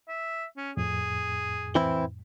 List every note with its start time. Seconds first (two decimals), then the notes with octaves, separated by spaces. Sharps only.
0.08 E5
0.57 C#4
0.77 F2 A2 G#4
1.75 E3 C4 E4